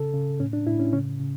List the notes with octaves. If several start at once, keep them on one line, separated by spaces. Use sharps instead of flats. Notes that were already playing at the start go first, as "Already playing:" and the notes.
Already playing: C#3 A4
C#3
A2 C#4
D4
A2 E4
C#4
C#3 C#4
C#3